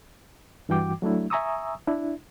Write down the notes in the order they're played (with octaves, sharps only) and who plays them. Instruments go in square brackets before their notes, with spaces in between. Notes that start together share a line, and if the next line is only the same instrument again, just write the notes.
[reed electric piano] G2 E3 F#4 G5 D6
F#3 A3 D4 E4
E5 G#5 A#5 C#6 D#6 E6
D4 E4